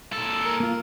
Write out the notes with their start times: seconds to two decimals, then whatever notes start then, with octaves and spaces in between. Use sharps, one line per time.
0.12 A#2 A4
0.45 A#4
0.60 A#3 F4